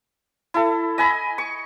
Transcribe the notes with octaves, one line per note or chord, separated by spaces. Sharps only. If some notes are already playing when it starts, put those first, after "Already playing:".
E4 A4
D#5 G#5 B5
C#6